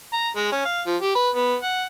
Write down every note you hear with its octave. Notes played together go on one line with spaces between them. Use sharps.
A#5
G#3
C#4
F5
F3
G4
B4
B3
F#5